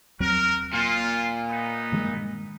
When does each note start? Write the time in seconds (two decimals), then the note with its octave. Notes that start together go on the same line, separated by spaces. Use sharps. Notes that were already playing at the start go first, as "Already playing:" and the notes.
0.20 D#2 F#3 C4 F#4 A#4
0.73 A#2 F4
1.49 B3 D#4
1.92 G2 D#3 G#3